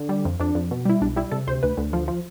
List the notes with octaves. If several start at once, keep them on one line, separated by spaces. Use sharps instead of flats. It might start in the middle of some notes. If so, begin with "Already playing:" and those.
Already playing: D3
G3
F2
F2 D4
F2
B2
G3 E4
B1 D4
G3 E4
C3 A4
D2 C5
D2 B4
D2
F3
F3